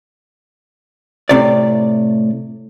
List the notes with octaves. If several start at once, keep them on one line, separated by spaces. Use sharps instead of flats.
A2 C3 D5